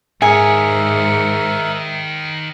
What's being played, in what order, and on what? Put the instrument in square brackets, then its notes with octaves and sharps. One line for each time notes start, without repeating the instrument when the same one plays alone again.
[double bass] G#2 [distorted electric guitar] D#3 C#5 [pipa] G#4 [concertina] A#4 E5